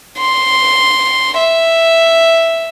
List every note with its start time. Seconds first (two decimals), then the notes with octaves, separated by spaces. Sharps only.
0.19 C6
1.38 E5